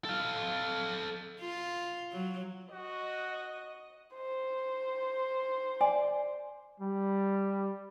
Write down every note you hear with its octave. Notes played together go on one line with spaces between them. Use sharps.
A4 F5
F4
F#3
F#4 D#5
C5
D5 G#5
G3